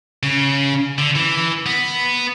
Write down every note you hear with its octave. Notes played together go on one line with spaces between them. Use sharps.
C#3
D3
E3
B3